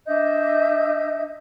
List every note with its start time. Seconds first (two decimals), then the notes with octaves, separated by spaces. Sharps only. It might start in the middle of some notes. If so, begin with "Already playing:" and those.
0.06 D4 D#5 E5 G6